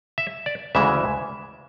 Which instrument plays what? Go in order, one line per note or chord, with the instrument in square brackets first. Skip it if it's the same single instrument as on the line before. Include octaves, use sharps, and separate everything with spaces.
[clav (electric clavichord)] E5
D5
D2 C#3 E3 G#3 E5